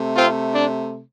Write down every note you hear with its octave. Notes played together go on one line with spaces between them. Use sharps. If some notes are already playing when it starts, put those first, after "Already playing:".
Already playing: C3 A3
C4 F4
D4